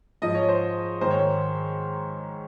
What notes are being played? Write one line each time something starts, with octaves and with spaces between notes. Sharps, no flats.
G#2 F3 D#5
C#5
C5
G#2 D#3 C5
C#5